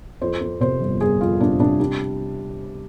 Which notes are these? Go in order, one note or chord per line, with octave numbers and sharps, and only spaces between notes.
F2 C5
F2
C3 C5
G1
G1 G#4
F2 F4
C3 D4
C3 D4
G3 D4